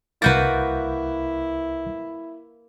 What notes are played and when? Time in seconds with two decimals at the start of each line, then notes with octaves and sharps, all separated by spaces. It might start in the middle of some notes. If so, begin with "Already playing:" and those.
0.22 C2 A#3 E4 F#4 B4 G6 A6